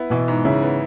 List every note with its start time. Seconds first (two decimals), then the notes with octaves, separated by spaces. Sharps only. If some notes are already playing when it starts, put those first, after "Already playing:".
Already playing: B3 E4
0.10 B2 E3
0.28 G#2
0.45 C#3 E4
0.63 B3